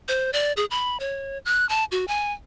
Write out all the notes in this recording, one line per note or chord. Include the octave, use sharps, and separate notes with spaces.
C5
D5
G#4
B5
C#5
F#6
A5
F#4
G#5